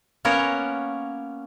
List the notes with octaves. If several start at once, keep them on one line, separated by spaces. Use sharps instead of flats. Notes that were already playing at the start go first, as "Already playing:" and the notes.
A#3 B3 C#4 A#4 C#5